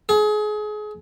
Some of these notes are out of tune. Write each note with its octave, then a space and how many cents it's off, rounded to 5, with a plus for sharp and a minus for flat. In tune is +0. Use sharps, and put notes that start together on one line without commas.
G#4 +30